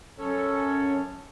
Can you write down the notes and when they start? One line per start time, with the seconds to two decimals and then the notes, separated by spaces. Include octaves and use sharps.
0.19 F#2 C#4 A4 C#5